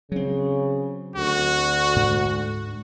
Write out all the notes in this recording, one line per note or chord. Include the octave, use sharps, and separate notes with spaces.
C#3 F#3 C4
D2 F#4
G#2